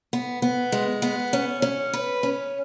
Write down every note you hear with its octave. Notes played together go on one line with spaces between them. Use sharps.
B3
B3
G#3
B3
C#4
C#4
B4
C#4